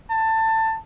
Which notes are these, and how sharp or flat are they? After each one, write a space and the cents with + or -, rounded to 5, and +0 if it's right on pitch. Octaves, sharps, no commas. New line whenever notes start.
A5 +20